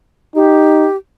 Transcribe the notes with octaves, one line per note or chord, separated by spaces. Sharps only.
D#4 G4